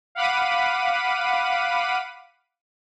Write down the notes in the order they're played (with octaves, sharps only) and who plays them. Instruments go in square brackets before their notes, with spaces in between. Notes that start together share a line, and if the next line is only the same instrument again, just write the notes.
[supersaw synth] F5 F#5 B5 D6 B6 D#7